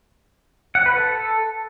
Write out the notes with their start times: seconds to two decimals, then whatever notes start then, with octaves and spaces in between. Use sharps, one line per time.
0.75 F#5
0.86 B4
0.97 A4